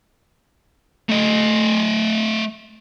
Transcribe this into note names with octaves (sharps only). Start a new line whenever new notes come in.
A3 D#5